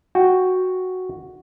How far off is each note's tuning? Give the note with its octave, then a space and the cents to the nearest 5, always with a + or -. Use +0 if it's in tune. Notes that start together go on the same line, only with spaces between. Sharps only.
F#4 +0 G5 +5